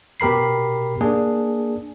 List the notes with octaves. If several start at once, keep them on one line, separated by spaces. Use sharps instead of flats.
B2 G4 A#4 B5 C7
A#3 D4 G#4